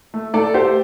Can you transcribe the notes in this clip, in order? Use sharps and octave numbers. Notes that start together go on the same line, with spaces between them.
A3
A3 A4 D5
A3 G4 C5